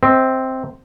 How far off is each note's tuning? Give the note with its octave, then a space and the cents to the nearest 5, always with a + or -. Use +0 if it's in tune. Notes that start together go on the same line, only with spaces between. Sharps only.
C4 +0 D#5 +45